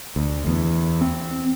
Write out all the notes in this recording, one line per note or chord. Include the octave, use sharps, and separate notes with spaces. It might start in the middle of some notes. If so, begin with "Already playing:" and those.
D2
E2
C4